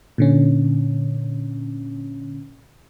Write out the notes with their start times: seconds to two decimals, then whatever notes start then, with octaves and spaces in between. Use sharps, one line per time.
0.18 A#2 D3 C#4